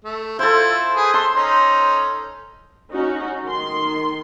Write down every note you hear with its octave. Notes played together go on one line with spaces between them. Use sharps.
A3
E4 F4 A4 C5
G#4 B4
A4 C6
C#4 D#4
C#4 D#4 F#4
D#3 C6